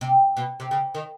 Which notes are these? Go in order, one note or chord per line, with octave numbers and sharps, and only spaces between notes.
C3
B2
C3
C#3
D#3